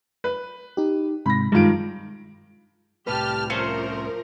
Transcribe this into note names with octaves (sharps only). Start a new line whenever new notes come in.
B4
D#4 G4
G#2 C3 B5 A#6
G2 D#3 G#3 F4 D7
C2 A2 G4 B4 A5 F6
F3 A3 C#4 A#4 C5